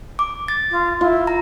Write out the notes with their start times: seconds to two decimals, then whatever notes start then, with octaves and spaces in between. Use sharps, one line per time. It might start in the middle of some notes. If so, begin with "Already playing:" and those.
0.19 D6
0.48 A6
0.71 F4
1.01 E4 F4
1.27 A#5